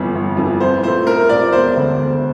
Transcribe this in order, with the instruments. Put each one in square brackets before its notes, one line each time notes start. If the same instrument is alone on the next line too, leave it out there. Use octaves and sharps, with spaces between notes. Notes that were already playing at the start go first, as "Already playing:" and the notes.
Already playing: [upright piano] G1 F2 E3
G1
F2 E3
[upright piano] C2 [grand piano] C5
[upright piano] A#2 A3 [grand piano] C5
[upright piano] C2 [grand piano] A#4
[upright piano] A#2 A3 [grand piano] D5
[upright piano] E1 [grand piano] C5
[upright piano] D2 D3
E1